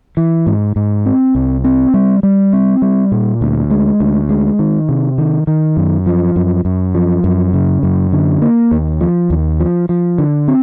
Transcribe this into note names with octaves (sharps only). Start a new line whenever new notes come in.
E3
G#2
G#2
C4
C2
C4
G3
G3
C4
G3
A#2
D2
G#3
D2
G#3
D#3
C3
D#3
D#3
F#2
F3
F#2
F#2
F3
F#2
C#3
F#2
D3
A#3
D#2
F3
D#2
F3
F3
D3
C4